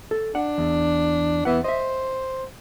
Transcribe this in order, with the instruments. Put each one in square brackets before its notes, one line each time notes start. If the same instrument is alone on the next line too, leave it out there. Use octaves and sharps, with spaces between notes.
[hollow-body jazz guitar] A4
[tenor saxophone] D4 [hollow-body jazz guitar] F#5
[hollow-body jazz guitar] E2
[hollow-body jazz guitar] E2 B3 F#5 [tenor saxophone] E3
[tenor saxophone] C5 [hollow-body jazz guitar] D#5 E5